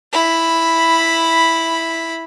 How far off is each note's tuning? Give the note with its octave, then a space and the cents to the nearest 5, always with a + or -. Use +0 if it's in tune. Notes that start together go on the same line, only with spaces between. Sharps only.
E4 +0 B5 +0